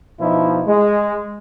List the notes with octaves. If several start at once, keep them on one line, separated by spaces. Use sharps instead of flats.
B2 F3 D#4 E4
G#3